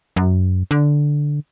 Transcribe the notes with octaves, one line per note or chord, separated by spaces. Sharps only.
F#2
D3